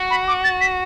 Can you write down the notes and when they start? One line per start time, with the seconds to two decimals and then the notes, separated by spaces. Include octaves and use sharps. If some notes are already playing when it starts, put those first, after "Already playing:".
Already playing: F#4
0.10 B5
0.28 D6
0.44 A6
0.61 B6